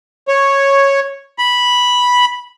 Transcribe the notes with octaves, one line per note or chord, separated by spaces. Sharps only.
C#5
B5